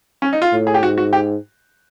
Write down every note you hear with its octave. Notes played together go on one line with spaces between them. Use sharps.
C#4
D#4
F4
A2
G#4
G4
G#2 F#4
F#4
G4